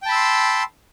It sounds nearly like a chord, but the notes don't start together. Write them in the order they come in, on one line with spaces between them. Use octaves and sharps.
G5 A5 B5 E6 C6